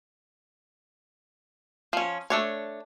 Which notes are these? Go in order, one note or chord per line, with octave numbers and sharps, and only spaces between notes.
F3 C#4
A3 D4 C#5